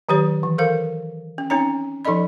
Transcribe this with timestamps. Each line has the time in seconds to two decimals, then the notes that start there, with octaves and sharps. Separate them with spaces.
0.09 D#3 F#3 G4 B4 C#5
0.43 E3
0.58 A4 A#4 C5 F5
1.38 C#4
1.50 C4 C#4 D#4 C#5 A#5
2.05 F3 D#4 A4 D5 D#5 B5